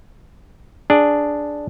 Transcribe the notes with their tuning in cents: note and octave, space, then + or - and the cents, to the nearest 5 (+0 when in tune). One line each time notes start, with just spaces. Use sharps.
D4 +0 G#4 +0